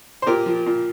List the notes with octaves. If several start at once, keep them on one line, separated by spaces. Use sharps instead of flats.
C5
A#2 G4 A#4
F3
A#2